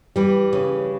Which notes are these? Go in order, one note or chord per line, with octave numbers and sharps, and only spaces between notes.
E3 G3
C#3